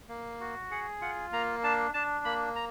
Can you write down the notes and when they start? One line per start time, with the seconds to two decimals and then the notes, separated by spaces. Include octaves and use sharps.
0.09 A#3
0.40 F#4
0.71 G#4 F#5
1.01 F4 F#5
1.32 A#3 A#5
1.63 D4 A5
1.94 D4 A5
2.25 A#3 B5
2.56 A#5